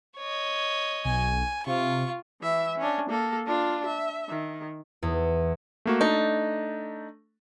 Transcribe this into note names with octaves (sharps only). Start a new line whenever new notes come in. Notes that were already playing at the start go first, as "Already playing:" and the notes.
C#5 D#5
B1 G#5
C3 F4 C#6
E3 E5
C#4 D4
A#3 A4
D4 F4
E5
D#3
E2
A3 A#3 F#4
A3 D4 D#4